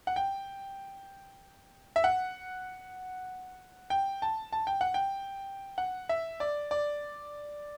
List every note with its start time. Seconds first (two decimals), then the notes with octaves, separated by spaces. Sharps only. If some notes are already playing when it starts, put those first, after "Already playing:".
0.07 F#5
0.16 G5
1.96 E5
2.04 F#5
3.90 G5
4.22 A5
4.52 A5
4.67 G5
4.81 F#5
4.94 G5
5.78 F#5
6.09 E5
6.40 D5
6.71 D5